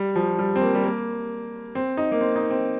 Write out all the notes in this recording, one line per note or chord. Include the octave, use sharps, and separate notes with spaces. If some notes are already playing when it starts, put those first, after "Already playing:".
Already playing: G3
F3
G3
C4
A#3
G3
A#3
C4
D#4
A#3
C4
D#4
C4